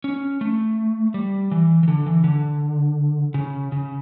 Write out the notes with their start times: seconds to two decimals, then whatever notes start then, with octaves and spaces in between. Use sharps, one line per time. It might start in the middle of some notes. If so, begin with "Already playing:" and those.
0.04 C#4
0.41 A3
1.14 G3
1.51 E3
1.83 E3
1.88 D3
2.06 E3
2.24 D3
3.34 C#3
3.72 C#3